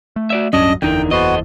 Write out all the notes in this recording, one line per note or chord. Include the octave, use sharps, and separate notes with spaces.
A3
F#4 D5 E5
D1 G2 F#3 C#4 D4 D#5
F#1 E2 D3 E3 D#4 A#4 G5
B3 F#4 A4 C5 D#5